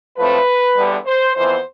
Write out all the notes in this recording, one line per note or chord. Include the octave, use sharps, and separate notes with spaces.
A2 F3 A3 C4 B4
E2 D3 G3 B3
C5
F2 E3 B3 C5